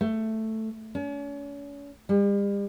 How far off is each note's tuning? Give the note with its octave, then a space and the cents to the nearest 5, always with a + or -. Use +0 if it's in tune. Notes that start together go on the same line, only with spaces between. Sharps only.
A3 +5
C#4 +40
G3 +40